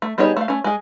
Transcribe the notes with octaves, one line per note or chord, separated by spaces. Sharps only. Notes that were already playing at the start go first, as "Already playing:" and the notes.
A3
G3 B3 D#4 G#4 C#5
A3 F5
A3 C#4
G#3 G#4